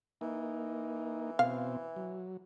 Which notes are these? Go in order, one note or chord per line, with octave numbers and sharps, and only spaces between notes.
E3 A#3 D#4
B2 C4 F5
F#3